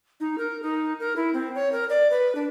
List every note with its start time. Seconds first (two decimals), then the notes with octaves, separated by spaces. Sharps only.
0.20 D#4
0.38 A#4
0.63 D#4
1.00 A#4
1.16 E4
1.33 C4
1.55 C#5
1.72 A#4
1.90 D5
2.11 B4
2.35 D4